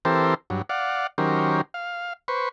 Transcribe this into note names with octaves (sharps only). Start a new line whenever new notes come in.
E3 C4 G4 A4 A#4 C5
G2 F#3
D5 F5 F#5
D#3 F#3 C#4 G4 A#4 C5
F5
B4 C5 C#6